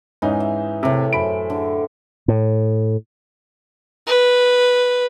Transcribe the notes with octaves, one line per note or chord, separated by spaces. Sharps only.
G#2 E3 C#4 D#4
E5
A2 C3 E4
F#2 C5 B5 D7
D3
A2
B4